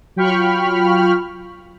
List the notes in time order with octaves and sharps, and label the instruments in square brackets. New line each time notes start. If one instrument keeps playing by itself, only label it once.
[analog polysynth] F#3 F4 G5 B5 C#6 F6